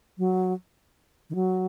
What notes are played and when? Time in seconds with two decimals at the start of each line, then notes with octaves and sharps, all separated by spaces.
0.18 F#3
1.30 D#3
1.35 F#3